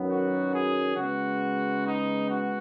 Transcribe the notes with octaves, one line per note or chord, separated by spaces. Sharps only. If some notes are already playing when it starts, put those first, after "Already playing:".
Already playing: F#2 D#3 F#3 B3
F#4
G#4
C#3 G#3 B3 F#4
D#4
F#4